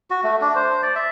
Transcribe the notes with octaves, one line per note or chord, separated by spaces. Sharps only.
F#4
A3
D4
C5
D5
E5